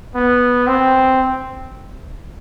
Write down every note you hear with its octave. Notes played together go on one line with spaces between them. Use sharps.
B3
C4